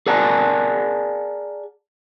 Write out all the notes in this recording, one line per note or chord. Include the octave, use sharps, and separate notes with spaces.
G#4 A#4 D5 F#5 G#5 A5